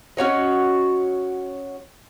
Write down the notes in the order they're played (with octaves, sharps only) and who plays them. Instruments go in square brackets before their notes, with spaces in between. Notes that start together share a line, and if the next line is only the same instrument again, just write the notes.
[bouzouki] C#4 F#4 C#5 D#5